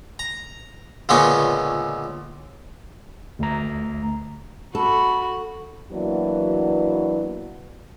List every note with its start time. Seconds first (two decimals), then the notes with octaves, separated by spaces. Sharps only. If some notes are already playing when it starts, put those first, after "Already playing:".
0.19 A#5
1.09 C#2 A#2 D3 B3 C#4 C6
3.39 D2 A3 A#5
4.75 F#4 A4 B5
5.92 E3 F#3 A#3 B3 D4 F#4